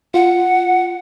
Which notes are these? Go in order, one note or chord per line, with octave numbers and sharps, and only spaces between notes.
F4 F#5